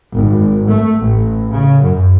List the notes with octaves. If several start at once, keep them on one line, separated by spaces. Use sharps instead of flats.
G#1
A3
A1
C#3
F#2